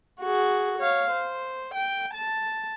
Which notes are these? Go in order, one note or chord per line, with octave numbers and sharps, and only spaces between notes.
F#4 G#4
C#5 F5
C5
G5
A5